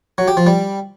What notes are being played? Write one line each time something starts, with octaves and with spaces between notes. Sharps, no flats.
F#3
G4
F3
G3